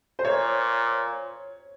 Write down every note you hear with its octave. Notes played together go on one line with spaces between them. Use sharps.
C5
A#2 C#5